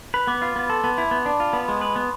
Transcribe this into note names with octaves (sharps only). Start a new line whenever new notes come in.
B4 B5
B3 D6
F4
B3
A4 C6
B3 A5
E4 B5
B3
D4
F4
B3 B5
G#3 C6
B4 B5
B3